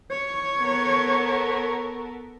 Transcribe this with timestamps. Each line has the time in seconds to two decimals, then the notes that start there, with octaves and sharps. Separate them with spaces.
0.10 C#5 C#6
0.59 B3 A4 A#4